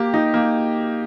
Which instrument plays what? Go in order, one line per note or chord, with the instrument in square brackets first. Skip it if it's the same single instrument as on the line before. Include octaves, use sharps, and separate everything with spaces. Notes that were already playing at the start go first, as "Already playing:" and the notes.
Already playing: [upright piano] A#3 G4
D#4
A#3